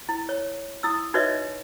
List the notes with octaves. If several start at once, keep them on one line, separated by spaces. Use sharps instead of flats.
E4
C#5
E4 D#6 E6
D#4 F#4 B4 C#5 D#5 E5